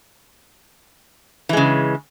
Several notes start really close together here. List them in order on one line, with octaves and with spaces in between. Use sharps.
E3 G#3 C#3